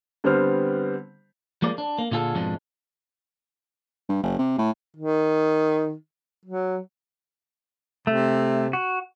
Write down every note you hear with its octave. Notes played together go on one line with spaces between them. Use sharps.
D3 G3 B3 C4 C5 F6
F3 G#3 A#3 D5
D4
A#3
A#2 D3 F4 G#4 A4
F2 G#2 B2 F3 G#3 D4
G2
F#1
C3
A2
D#3
F#3
C3 A3
F#4